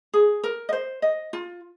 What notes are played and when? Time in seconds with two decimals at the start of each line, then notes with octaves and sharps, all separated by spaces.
0.13 G#4
0.44 A#4
0.69 D#5
0.73 C5
1.02 D#5
1.33 F4